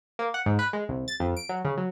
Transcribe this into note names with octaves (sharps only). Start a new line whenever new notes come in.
A#3
F#5
G#2
B4
G#3
C2
A6
F2
D7
F#3
C#3
F#3